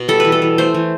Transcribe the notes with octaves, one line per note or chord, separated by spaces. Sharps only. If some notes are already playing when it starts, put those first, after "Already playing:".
Already playing: B2
G3 A4
E3 B4
A4
E3
A3 C5
E3